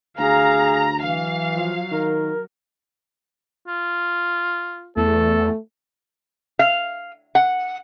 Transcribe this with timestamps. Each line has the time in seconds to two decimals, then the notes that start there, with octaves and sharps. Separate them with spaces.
0.19 D2 G#4 F5 A#5
1.01 E3 F#3 F5
1.56 F3
1.91 D#3 A#4
3.68 F4
4.97 E2 A3 A4
6.59 F5
7.35 F#5